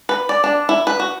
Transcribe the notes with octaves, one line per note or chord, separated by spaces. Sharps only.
B4
D5
D4
E4
B4
F#4